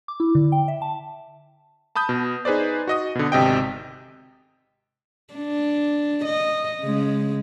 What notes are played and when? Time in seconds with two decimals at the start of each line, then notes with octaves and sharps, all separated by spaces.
0.08 D6
0.20 E4
0.35 D3
0.52 G5
0.68 E5
0.82 A5
1.95 A5 B5 D#6 G6
2.09 B2
2.45 D#4 G#4 B4 C5 D5
2.87 F#4 D#5 D#6
3.15 B2 D3
3.32 G#1 C3 D#5 G5
5.34 D4
6.25 D#5
6.81 C#3 G#3